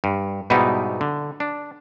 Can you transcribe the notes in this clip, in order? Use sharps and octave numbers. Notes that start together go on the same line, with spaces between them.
G2
G#2 B2 G3 B3 D#4 E4
D3
D4